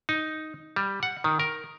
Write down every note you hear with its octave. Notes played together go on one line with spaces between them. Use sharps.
D#4
G3
F#5
D#3
A#4